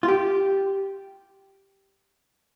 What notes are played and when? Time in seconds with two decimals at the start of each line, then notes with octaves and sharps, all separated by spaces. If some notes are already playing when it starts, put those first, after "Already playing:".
0.03 F4
0.08 G4